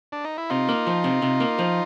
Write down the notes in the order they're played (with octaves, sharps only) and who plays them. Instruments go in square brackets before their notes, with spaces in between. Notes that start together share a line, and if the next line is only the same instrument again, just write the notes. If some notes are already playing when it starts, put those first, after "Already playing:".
[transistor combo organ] D4
D#4
E4
[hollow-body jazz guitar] C3 [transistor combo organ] D#4 F4
[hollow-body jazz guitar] A#3
F3
C3
C3
A#3
F3